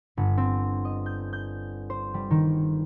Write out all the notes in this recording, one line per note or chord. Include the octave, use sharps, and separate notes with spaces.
G1
C4
D#5
G6
G6
C5
G3
D#3